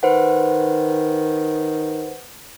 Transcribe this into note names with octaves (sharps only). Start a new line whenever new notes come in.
D#3 B4 C5 F#5